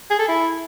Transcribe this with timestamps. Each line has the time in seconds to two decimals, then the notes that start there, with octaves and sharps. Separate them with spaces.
0.10 G#4
0.19 A4
0.28 E4